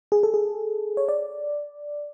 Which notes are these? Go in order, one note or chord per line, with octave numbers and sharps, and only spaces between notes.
G#4
A4
G#4
C#5
D5